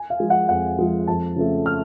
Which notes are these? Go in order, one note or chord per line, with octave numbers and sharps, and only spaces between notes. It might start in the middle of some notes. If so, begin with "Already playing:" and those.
Already playing: G#5
F5
F3 G#3
F#5
F2 F#5
F3 G#3
F2 A5
C#3 F3 A3
F6